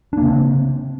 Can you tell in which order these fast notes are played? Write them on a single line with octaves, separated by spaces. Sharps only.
D4 A#3 C#3 C4